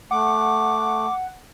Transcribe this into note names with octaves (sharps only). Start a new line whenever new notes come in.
A3 F#5 D6